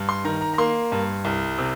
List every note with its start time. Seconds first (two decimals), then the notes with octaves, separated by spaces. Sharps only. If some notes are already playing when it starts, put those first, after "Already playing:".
Already playing: G2
0.09 C6
0.25 D#3 A#5
0.41 A#5
0.54 A#5
0.58 A#3 C6
0.92 G2
1.25 C2
1.58 C3